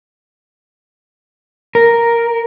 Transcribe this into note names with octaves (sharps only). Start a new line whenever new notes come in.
A#4